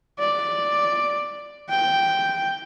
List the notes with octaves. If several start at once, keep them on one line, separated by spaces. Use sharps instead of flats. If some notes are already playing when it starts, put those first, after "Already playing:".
D5
G5